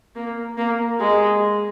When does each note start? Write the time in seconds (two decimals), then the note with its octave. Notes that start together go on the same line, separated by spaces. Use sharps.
0.15 A#3
0.58 A#3
1.00 G#3